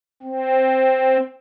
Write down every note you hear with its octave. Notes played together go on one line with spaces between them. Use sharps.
C4